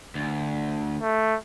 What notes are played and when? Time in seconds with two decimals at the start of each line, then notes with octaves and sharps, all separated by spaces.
0.15 D2
1.01 A3